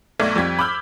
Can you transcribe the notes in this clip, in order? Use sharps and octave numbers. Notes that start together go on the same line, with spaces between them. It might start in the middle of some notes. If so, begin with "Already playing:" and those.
B1 A3 D5 G#6
F2 G3 G#6 B6
B5 D6 E6 F6 G6